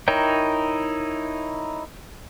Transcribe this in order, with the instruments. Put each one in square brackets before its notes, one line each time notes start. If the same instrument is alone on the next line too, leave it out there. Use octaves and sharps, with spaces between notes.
[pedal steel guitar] D#4 E4 A#4 C#5 G5